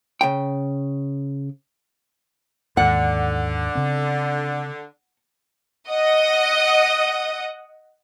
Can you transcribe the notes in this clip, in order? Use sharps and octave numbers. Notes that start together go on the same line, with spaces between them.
C#3 G5
D#2 G#2 D3 F#5
C#3 C4
D#5 F#5 D#6